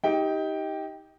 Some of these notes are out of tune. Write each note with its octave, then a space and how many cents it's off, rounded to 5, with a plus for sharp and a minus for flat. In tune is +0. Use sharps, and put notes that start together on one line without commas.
D#4 +25 G4 +0 G5 +0